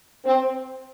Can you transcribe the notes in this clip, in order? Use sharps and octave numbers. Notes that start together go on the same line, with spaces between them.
C4